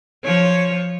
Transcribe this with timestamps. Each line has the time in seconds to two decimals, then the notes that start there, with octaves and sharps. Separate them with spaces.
0.25 F3 C#5